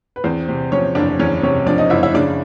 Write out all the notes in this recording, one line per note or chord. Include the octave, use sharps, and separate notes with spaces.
B4
E2 C4 C5
C3
F3 C#4 C#5
F#1 D4 D5
E2 C#4 C#5
C3 C#4 C#5
F3 D4 D5
D#4 D#5
F#1 E4 E5
E4 E5
C#3 D4 D5